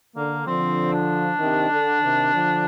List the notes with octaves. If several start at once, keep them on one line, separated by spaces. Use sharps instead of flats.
D3 A#3
D3 F3 C4
D4
C3 D#3
D3
C3 D#3
D3 F3